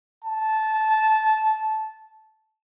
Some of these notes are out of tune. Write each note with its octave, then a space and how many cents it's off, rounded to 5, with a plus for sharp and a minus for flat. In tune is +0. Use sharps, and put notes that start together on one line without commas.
A5 -15